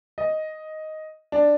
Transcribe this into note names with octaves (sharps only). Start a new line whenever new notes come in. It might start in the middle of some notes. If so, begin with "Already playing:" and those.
D#5
D4